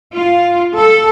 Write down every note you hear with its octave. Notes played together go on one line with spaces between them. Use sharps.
F4
A4